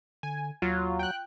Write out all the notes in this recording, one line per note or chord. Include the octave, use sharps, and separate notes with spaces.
D3 G#5
D#2 F#3 F4
G5 F#6